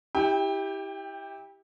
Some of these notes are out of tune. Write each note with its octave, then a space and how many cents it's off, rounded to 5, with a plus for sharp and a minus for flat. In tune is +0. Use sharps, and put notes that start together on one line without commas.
E4 -25 G4 +0 G5 +25